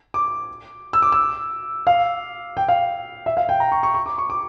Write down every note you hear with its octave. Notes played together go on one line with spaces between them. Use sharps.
D6
E6
D6
E6
F5
G5
F5
E5
F5
G5
A#5
C#6
C#6
C#6
D6
C#6
D6